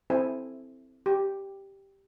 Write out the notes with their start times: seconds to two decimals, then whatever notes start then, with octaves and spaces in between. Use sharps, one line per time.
0.10 C4 E4 A4 C5 G#5
1.06 G4